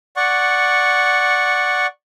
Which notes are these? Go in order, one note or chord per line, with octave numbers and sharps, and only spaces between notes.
D5 F#5 C#6